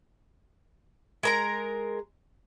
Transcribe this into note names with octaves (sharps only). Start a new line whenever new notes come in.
G#3 A#4 A#5